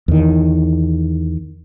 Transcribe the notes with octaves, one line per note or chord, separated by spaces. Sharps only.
E2 D#3